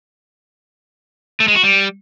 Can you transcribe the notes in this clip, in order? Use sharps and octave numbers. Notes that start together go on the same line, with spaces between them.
A3
G#3
F#4
G3